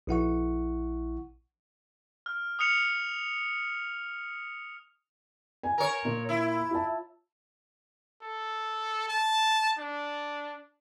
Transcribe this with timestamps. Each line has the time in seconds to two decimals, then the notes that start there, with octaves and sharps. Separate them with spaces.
0.07 A#1 E4 F#5 C#6
2.26 F6
2.59 D#6 F6 C#7 F7
5.63 G#5
5.78 A#4 C#5
6.05 A#2
6.29 E4
6.71 F4 A5
8.22 A4
9.08 A5
9.79 D4